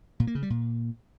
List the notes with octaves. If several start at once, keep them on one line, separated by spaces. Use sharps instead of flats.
A#2
A#3
C#3
G3
A#2